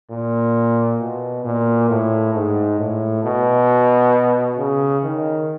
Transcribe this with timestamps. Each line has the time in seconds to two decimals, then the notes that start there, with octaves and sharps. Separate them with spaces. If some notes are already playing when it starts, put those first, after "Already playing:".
0.10 A#2
1.00 B2
1.44 A#2
1.89 A2
2.34 G#2
2.79 A2
3.24 B2
4.57 C#3
5.03 D#3